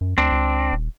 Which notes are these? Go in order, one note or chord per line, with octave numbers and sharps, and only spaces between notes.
F#2
D2 C4 D4
C#2
D#1